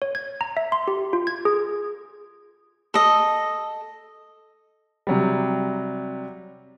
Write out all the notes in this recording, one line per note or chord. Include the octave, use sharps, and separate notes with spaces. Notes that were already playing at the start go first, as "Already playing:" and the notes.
C#5
G#6
A#5
E5
C6
G4
F4
G#6
G#4
A4 D#5
C3 F#3 G3